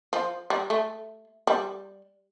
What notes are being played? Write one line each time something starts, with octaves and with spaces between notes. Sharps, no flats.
F3
G3
A3
G3